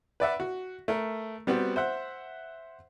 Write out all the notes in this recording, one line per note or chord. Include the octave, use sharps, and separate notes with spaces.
B4 D5 E5 F#5
F#4
A3 A#4
G3 B3 C4 F#4
C5 E5 F#5